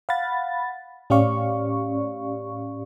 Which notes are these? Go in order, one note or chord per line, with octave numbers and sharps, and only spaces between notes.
F5 F#5 B5 A6
A2 C#4 G4 D5 F5 C#6